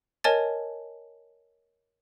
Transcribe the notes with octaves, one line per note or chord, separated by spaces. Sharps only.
A#4 C#5 D#5 G#5 A5 A6